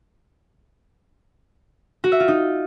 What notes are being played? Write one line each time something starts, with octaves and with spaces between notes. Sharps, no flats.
F#4
E5
F4
D#4